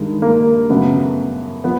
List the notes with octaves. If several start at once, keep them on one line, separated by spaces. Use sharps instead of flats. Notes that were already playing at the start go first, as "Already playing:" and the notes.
Already playing: G2 D#3 G#3
A#3
F#2 C#3 F#3 A3 B3
F3 B3